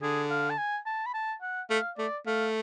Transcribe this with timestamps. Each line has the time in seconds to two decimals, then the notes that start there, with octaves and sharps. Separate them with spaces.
0.02 D3 G#4
0.31 F5
0.50 A5
0.58 G#5
0.86 A5
1.06 B5
1.14 A5
1.42 F#5
1.70 A3 F5
1.98 A3 D5
2.26 A3 F5